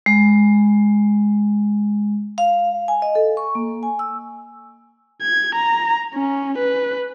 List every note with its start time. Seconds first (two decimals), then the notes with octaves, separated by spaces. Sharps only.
0.06 G#3
2.38 F5
2.88 G#5
3.02 D#5
3.15 A4
3.37 C#6
3.55 A#3
3.83 G#5
3.99 E6
5.22 G#6
5.55 A#5
6.15 C#4
6.58 B4